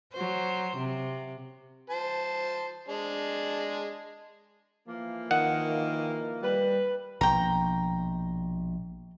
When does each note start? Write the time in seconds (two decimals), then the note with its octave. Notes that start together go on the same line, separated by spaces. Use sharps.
0.13 F#3 C5
0.77 C3
1.90 C5 A5
2.88 G#3 D4
4.88 E3 F3 A#3
5.31 D#3 F#5
6.42 G3 B4
7.21 A#1 B2 G5 A#5